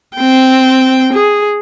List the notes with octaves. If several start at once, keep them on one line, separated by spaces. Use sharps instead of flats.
C4 G5
G#4